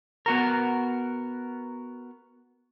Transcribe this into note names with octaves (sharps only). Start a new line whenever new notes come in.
B3 F#4 A#4